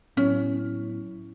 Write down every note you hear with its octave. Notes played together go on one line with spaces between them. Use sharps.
A2 F#3 B3 C#4 E4